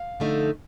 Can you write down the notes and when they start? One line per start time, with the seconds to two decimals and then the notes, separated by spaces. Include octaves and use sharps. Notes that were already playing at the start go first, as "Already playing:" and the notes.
Already playing: F5
0.20 D3 F3 A3 D#4